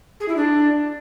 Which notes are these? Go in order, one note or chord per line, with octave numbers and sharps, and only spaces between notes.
G#4
E4
D4